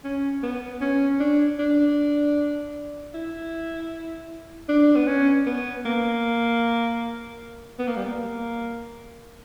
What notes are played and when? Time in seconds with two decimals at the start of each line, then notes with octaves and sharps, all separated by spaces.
0.04 C#4
0.43 B3
0.81 C#4
1.20 D4
1.59 D4
3.14 E4
4.69 D4
4.96 B3
5.07 C#4
5.46 B3
5.85 A#3
7.79 B3
7.88 A#3
7.97 G3
8.06 A#3